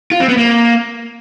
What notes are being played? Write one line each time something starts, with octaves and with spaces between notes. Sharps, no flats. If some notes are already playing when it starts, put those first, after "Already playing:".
F4
C4
B3
A#3